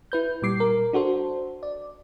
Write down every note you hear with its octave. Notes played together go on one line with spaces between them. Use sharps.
E4 B4 G6
A#2 G3 D6 C7
A#4
D4 F#4 A4 C5
D5